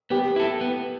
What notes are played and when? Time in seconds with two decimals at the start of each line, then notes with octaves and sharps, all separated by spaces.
0.10 B3 G4
0.36 E4 A4
0.61 B3